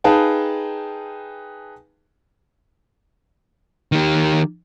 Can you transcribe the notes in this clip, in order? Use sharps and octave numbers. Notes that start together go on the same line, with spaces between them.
D#4 G#4 B4 F5 G5 A5
D#3 G4